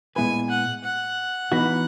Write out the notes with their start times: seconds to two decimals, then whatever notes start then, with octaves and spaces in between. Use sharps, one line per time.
0.16 A#2 G#3 B3 E4 B4 G#5
0.50 F#5
0.84 F#5
1.52 E3 B3 D#4 F#4